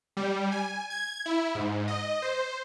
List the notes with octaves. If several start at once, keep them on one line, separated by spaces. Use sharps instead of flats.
G3
G#5
G#6
E4
G#2
D#5
C5